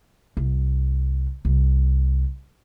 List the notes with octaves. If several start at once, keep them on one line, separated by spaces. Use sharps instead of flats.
C2
C2